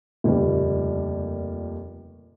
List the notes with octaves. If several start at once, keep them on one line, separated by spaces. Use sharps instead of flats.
F1 D#2 A#2 C#3 G3